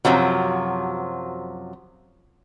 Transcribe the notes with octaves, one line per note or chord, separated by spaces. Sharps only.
F#2 C3 F3 F#3